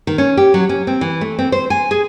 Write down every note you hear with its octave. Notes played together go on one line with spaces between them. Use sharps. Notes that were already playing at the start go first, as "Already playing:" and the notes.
D#3
C#4
G4
F#3
C#4
C4
E3
A3
C4
C5
G#5
G#4